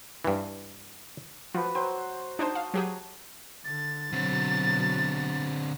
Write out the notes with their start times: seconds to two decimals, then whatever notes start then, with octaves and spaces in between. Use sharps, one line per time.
0.25 G2 E3
1.54 F3 F#4 B4
1.75 F#3 C5 G5
2.39 D4 D#4 C5 A5 C6 D#6
2.55 F5
2.74 F#3 G4 G#4 C#5
3.65 D3 A6
4.13 B2 D3 F#3 C4